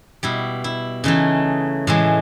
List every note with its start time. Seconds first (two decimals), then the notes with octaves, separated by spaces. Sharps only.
0.23 B2 G3 E4
0.64 E4
1.04 C#3 E3 A3 D#4
1.87 A2 E3 G#3